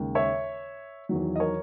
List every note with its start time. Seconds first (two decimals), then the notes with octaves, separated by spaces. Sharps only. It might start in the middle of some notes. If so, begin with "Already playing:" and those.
Already playing: D#2 C#3 G#3
0.15 C#5 E5
1.09 E2 D#3 F#3
1.36 D#5
1.40 A#4 C#5